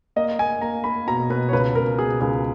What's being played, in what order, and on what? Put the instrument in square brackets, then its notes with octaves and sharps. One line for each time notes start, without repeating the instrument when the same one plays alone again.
[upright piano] A#3 D#5
A#3 G#5
A#3 A#5
A#3 B5
B2 A#5
B2 B4
C#5
C#2 B4
C#2 A#4
B2 G#4
C#2 G#4